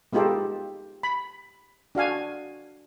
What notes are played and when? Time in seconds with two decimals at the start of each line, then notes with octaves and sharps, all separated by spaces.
0.13 G#3 B3 D#4 F4 G4 A4
1.03 B5
1.95 D4 F#4 F5 G#5